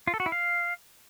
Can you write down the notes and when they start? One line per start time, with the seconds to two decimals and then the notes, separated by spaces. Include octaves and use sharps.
0.07 F4
0.14 A4
0.20 F#4
0.26 E4
0.32 F5